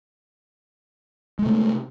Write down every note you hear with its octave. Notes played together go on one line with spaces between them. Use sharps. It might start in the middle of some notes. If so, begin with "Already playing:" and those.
C3 G#3 A3